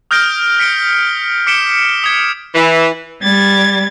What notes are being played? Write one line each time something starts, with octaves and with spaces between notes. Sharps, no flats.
D#6 F6 G6 A#6 D7 G7
B6 C#7 D7 G7
D6 B6 C#7 D7 E7 G7
D#6 G#6
E3
G3 G#6 A6